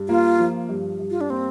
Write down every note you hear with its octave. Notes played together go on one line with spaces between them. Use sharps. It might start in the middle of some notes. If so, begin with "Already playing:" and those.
Already playing: G2
A#3 F4
F3
G2
G2
F4
D4
A#3 C4